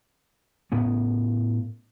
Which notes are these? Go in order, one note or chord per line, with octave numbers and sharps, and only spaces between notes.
A2 B3 C#4